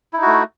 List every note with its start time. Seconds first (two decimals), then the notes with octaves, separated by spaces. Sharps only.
0.13 E4
0.18 D#4
0.22 F#4
0.27 A3